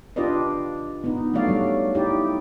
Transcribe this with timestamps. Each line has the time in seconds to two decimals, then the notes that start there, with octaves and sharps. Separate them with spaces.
0.16 D4 F4 G4 B4 D5 D#5
1.04 B3 D#4
1.34 F#3 A3 D4 F#4 D5 F5
1.48 F#3 G3
1.95 D#4 E4 G4 D5